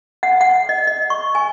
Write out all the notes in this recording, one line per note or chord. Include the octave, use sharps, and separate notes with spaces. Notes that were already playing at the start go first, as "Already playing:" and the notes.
F#5
F#5
D#5
D#5
C#6
G#5